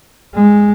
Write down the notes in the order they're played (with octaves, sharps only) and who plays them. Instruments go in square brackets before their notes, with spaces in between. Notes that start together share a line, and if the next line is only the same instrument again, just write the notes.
[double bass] G#3